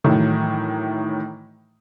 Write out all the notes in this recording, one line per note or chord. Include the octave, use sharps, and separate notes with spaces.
A2 D#3 E3 F#3 A3